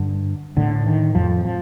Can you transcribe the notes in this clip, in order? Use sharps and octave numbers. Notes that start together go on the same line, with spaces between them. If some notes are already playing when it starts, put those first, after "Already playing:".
Already playing: G2 D3
A2 D3
D#3
F2 F3
F3